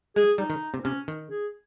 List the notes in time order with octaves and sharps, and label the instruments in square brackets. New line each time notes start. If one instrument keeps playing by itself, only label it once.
[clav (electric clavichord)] G#3 [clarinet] G#4
[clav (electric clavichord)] G3 [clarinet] D#4
[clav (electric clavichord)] D#3
C3
[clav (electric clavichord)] C3 [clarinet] C#4
[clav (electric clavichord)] D#3
[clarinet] G#4